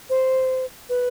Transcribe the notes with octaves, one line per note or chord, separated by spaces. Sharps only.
C5
B4